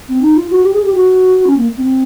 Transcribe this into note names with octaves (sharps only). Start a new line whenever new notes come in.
C4
D#4
F4
F#4
G4
G#4
G4
F#4
C#4
A#3
C4